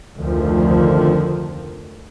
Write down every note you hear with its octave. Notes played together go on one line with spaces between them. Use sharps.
F1 D2 D3 D#3 F3